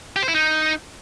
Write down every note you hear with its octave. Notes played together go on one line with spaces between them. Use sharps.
G4
C5
E4
D#4